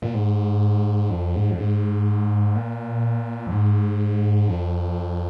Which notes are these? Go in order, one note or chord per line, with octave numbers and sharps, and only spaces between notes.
A#2
G#2
F2
G#2
F2
G#2
A#2
F2
G#2
F2